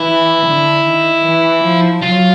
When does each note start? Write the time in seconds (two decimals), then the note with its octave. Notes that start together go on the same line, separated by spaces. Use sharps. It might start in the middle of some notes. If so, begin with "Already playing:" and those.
Already playing: E3 E4
0.45 D3
0.85 D#3
1.23 E3
1.63 F3
2.02 F#3 F4